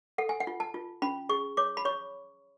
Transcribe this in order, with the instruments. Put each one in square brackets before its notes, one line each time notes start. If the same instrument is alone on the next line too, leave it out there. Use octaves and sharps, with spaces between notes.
[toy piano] A4 F#5
G#5
F#5
F4
A5
F4
C#4 B5
G#4 C#6
C#5 D6
B5
C#5 C#6